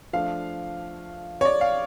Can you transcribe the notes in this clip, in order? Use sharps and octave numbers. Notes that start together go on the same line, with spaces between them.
F3 A3 D4 F5
C#5
D5
F5